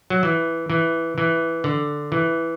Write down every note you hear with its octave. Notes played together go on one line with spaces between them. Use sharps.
F#3
E3
E3
E3
D3
E3